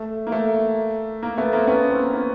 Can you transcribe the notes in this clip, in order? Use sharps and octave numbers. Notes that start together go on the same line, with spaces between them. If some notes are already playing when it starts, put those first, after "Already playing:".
Already playing: A3
A#3
A3
A#3
A3 B3
A#3 C4
B3 C#4
A#3 C4
A#3 C4